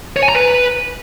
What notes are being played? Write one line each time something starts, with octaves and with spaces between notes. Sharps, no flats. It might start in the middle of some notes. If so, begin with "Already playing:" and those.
C#5
G#5
A#5
B4